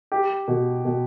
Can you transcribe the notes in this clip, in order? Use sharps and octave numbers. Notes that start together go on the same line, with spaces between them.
G4
B2
B2